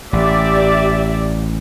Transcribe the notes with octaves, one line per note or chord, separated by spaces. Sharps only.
A1 G4 D5 E5